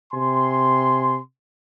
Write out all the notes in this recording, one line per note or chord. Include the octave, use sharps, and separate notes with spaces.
C3 G#5 C6